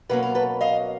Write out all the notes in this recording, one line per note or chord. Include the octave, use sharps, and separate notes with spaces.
B2 F#3 A#3 C#4 B4
A#4
A4 B4
D#5 F5